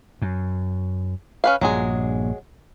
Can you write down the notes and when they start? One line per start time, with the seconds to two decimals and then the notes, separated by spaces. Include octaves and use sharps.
0.22 F#2
1.44 C#4 B4 F5
1.61 A#1 G2 F#3 G#3 G#4